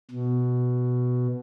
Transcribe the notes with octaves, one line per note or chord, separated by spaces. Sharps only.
B2